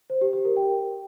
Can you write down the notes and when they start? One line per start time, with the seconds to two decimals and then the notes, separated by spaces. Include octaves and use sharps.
0.10 C5
0.21 G4
0.33 G4
0.45 A#4
0.57 G5